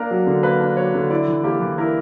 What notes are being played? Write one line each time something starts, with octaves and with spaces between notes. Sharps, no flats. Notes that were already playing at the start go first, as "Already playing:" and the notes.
Already playing: A#3 D4 A#4
F#3
D3
A#3 B4
D4
F#3 C#5
D3
E4 D5
E3
A#3 G4
E3
E4 A#4